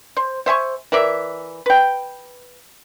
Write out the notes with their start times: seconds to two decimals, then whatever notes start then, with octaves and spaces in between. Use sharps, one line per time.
0.17 C5
0.46 C5 E5 G#5 C#6
0.92 E3 A#4 D5 E5
1.66 B4 G5